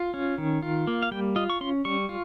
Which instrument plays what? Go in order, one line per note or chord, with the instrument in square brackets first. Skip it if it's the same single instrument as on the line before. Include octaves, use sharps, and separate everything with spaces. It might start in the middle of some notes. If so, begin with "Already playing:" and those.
Already playing: [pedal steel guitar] F4
C#4
D#3
F4
A#3
F5
G3 G5
F4 D#5
C#6
C#4 C6
G3 C#6
F4